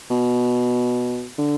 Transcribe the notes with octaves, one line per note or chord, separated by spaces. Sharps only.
B2
D3